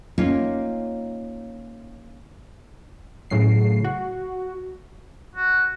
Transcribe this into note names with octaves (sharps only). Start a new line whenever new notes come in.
A#3 C#4 D#4 F4
A2 C#3 F#3 C7
F#4
F#4